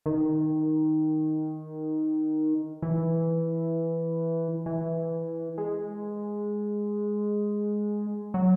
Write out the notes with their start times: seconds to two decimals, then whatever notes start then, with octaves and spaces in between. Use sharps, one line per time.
0.06 D#3
2.82 E3
4.66 E3
5.58 G#3
8.34 F#3